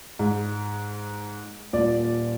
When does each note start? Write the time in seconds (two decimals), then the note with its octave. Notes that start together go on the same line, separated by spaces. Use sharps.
0.19 G#2
1.73 D#1 A#2 D5